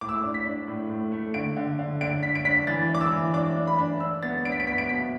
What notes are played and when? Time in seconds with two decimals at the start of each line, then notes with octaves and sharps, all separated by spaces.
0.01 A2 D6
0.09 E6
0.16 D6
0.24 D4
0.34 B6
0.45 D4
0.68 A2
0.90 A2
1.12 A3
1.34 D3 D7
1.57 D3
1.79 D3
2.01 D3 D7
2.23 D4 B6
2.35 D7
2.45 D4 B6
2.67 E3 A6
2.90 D4 D6
3.01 E6
3.12 E3
3.33 D4 D6
3.56 D4
3.67 B5
3.78 D4
4.00 D4 E6
4.22 B3 A6
4.45 D4 D7
4.52 B6
4.60 D7
4.67 B3 B6
4.78 D7
4.89 B2 B6